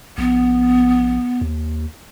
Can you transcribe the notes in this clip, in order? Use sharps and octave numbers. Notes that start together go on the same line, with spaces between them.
A#1 B3
D#2